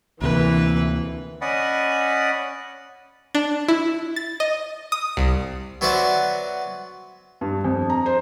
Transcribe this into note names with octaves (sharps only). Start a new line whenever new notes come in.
D2 C3 E3 A#3 B4
C#4 D5 D#5 F#5 G#5 B5
D4
E4
A6
D#5
D#6
C2
F#3 B3 F#4 C5 D5 E5
G2
F2
A#5
C5